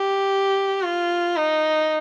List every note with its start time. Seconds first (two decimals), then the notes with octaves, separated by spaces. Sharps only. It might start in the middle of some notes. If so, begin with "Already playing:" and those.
Already playing: G4
0.82 F4
1.36 D#4